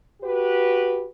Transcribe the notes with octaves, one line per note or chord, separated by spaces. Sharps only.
F#4 G4 B4